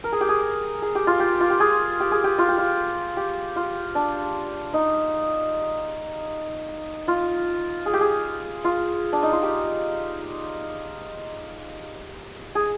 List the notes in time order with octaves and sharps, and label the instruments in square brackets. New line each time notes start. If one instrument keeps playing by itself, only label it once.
[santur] A#4
G#4
G4
G#4
G#4
G4
F4
G4
F4
G4
G#4
G4
G#4
G4
F4
G4
F4
G4
F4
D4
D#4
F4
G#4
G4
G#4
F4
D4
D#4
F4
G4
G#4